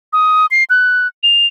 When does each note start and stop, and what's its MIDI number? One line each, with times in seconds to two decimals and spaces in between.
0.13 0.46 87
0.51 0.64 96
0.70 1.07 90
1.23 1.47 101